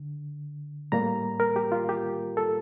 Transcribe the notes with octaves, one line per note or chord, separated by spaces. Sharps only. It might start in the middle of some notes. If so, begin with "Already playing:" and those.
Already playing: D3
A2 G3 A#3 A#5
A#4
G4
F4
G4
A4